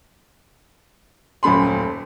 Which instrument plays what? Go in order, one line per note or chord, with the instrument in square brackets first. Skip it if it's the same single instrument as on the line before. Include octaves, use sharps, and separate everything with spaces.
[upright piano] D#1 F#2 A3 B5 C6